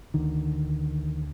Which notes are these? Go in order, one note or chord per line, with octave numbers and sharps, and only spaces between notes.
D2 D3 D#3